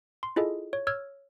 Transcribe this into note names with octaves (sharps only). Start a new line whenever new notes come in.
C6
E4 F4 G#4 A4 D#5
C#5
C#5 E6 F6 G#6